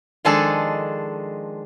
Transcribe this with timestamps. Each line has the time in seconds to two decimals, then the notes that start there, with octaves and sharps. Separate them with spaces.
0.25 D#3 F3 G#3 D4 G#4 A4